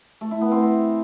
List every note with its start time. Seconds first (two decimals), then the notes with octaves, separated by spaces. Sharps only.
0.21 A3
0.31 E4
0.41 B3
0.52 C4
0.62 C4